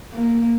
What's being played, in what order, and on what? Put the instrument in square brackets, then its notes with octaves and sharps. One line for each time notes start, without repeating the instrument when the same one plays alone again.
[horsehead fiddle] A#3